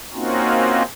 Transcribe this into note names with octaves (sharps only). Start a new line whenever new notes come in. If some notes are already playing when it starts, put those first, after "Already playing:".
A#3 C4 C#4 D#4 F4 F#4